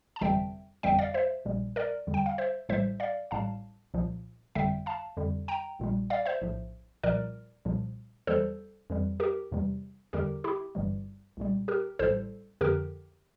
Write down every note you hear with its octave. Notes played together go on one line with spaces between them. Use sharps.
A5
G1 F2 C3 E3 G3 E5 G5
G1 F2 E3 G3 E5 G5
D5 F5
C5 E5
A#1 A#2 G3
A#4 D5
E2 D3 G3
G5
F5
C5 E5
A1 A2 E3 G3 C5 E5
D5 F5
A1 A2 G3 F5 A5
C2 A#2 F3
G1 F2 D3 G3 E5 G5
F5 A5
F2 D3 G3
G5 A#5
A#1 A#2 G3
D5 F5
C5 E5
A#1 A2 F3
C2 A#2 F3 A#4 D5
C2 A#2 F3
E2 E3 G3 A4 C5
F2 E3 G3
G4 A#4
E2 C3 E3 G3
E2 D3 G3 G4 A#4
E4 G4
G1 G2 E3 G3
C2 A#2 G3
G4 A#4
A1 A2 E3 G3 A4 C5
F2 D3 F3 G4 A#4